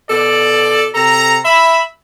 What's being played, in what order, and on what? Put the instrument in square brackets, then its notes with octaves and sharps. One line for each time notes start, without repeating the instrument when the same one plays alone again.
[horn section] B2 A4 D5
C3 A4 A#5
E5 B5